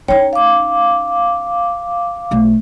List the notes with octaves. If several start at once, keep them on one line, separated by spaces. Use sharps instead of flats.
C#4 D#4 C#5 G5
F5 D6
B1 A3